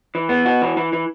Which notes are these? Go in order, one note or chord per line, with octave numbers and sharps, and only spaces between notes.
E3
B3
F#4
E3
E3
E3